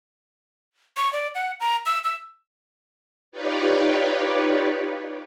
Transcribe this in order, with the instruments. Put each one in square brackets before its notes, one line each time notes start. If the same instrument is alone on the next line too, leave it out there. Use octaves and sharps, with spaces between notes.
[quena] C#6
D5
F#5
A#5
E6
E6
[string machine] D#4 F4 G4 B4 C#5 D5